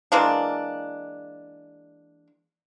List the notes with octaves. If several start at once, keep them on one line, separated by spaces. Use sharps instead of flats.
E3 G#3 A#3 D4